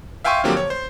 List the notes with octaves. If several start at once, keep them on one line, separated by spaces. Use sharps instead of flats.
E5 F5 G5 G#5 C6 C#6
D3 F3 F#3 A#3 C4 G4
C#5
C5